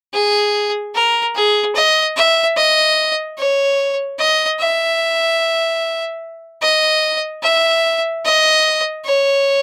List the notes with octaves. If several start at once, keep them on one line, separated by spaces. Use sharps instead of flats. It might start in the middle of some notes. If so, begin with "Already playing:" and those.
G#4
A#4
G#4
D#5
E5
D#5
C#5
D#5
E5
D#5
E5
D#5
C#5